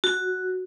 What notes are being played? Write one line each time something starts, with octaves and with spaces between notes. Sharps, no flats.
F#4